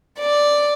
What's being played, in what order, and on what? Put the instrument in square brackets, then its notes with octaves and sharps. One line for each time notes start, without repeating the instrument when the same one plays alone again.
[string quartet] D5